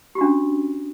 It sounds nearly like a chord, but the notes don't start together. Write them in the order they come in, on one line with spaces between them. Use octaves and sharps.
G4 F#4 D4 C#4